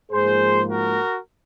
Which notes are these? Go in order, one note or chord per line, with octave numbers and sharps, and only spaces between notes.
G#2 F3 A#3 G#4 C5
F#4 A#4